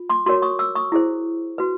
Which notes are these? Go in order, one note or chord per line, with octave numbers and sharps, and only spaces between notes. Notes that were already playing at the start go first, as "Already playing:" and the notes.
Already playing: F4
C6 D6
F#4 A#4 C#5 C6 D6
C#6 D#6
D6 E6
C#6 D#6
E4 G#4 C5
F#4 B4